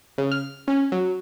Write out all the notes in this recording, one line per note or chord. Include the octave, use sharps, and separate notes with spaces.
C#3
F6
C#4
F#3